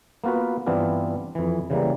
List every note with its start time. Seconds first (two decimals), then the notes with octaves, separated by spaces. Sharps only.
0.24 A#3 B3 F4 F#4 B4
0.66 G2 E3 B3 C4 D4 F4
1.35 F2 E3
1.70 C#3 E3 G3 A#3